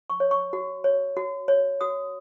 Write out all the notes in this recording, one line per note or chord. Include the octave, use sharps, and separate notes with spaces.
C#6
C#5
C#6
F#4
C#5
F#4
C#5
F#4 D#6